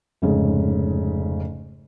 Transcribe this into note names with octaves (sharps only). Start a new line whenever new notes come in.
F1 G#2 C#3